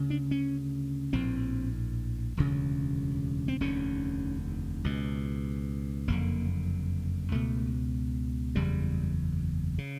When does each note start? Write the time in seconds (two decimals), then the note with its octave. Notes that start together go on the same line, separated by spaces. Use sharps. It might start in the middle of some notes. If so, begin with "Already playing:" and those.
Already playing: D2 C#3
0.10 D4
0.31 C#4
1.13 A#1 A2 C4
2.37 E1 D2 C#3
3.48 C4
3.61 F1 D#2 D3 C#4
4.84 C#2 B2
6.07 F#1 F2 D3 A#3
7.32 C#2 B2 A3
8.55 F#1 E2 C#3 G3
9.78 C#3